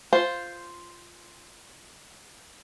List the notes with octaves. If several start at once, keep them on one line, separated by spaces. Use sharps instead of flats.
F4 C5